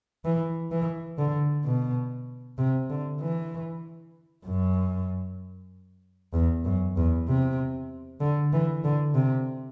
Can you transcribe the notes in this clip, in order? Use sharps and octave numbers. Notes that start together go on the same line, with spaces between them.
E3
E3
D3
B2
C3
D3
E3
F#2
E2
F#2
E2
C3
D3
E3
D3
C3